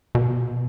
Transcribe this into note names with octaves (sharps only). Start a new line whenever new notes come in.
B2